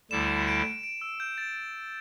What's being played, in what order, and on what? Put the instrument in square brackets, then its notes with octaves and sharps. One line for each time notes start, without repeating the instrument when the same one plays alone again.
[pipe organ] D2 D3 G3 E4 [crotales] E7
[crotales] D7
D7
E6
G6
A6